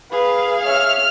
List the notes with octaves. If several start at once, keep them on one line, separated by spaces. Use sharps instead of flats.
G#4 B4 F5
C#5 E5 F6